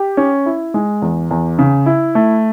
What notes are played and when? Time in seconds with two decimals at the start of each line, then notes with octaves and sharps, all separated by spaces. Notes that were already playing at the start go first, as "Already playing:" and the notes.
Already playing: G4
0.17 C#4
0.46 E4
0.74 G#3
1.02 E2
1.31 E2
1.59 C#3
1.86 E4
2.15 A3